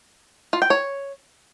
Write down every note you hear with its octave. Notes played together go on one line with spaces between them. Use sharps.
F4
G5
C#5